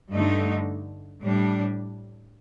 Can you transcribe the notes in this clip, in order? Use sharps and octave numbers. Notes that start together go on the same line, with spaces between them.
G2 D3 A3 D#4
A2 G3 D4